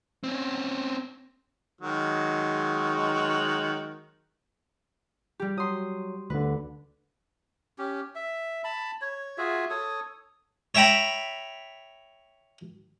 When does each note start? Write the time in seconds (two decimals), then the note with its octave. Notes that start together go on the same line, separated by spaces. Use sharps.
0.24 C4 C#4
1.81 D#3 F#3 G#3
5.40 G3 G4
5.57 F#3 C6 D#6
6.30 D2 D3 B4
7.78 C#4 G4
8.15 E5
8.64 A5 B5
9.01 C#5
9.38 F4 F#4 G#4 E5
9.70 A4 C#5 D#6
10.75 C#5 E5 G5 A#5 B5